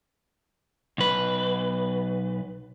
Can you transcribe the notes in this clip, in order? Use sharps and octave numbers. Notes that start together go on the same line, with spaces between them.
B1 B4